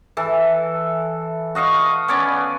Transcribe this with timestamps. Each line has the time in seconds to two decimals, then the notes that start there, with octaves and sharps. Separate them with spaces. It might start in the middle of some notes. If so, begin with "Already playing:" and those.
0.17 E3 A4
1.55 F#4 D#5 F5 C#6
2.08 B3 C#4 C#5 D5